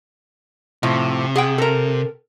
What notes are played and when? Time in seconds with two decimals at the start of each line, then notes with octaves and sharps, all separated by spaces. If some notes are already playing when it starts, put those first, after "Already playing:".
0.83 A2 C3 F3
1.36 G#4 F#5 G5
1.58 A4 A#4